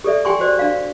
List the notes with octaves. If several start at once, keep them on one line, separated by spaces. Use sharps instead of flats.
G4 A4 D5 E5
G4 G5 G#5 C6 C#6
F#4 C5 D5
D4 F5